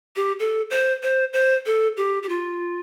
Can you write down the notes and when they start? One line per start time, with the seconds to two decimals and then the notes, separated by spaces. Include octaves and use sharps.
0.16 G4
0.40 A4
0.70 C5
1.03 C5
1.33 C5
1.66 A4
1.97 G4
2.23 G4
2.29 F4